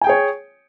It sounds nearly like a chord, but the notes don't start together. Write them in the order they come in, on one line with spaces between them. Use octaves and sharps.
G#5 G5 G#4 C#5